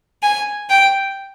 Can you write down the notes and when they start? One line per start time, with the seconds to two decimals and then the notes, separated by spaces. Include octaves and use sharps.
0.23 G#5
0.70 G5